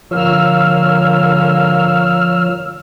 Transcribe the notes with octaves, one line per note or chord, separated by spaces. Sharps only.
G#2 D3 F3 A#3 C#5 E6 F6